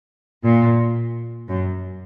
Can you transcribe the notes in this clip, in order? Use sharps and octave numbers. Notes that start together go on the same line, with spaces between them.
A#2
F#2